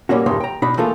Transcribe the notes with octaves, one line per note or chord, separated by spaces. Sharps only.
A#2 G3 A#3 C#4 F#4
E2 G2 A#2 D#3 G#3 C6
G5 A#5
B2 D4 D#4 B5
E3 A3 A#3 F4 G#4 A4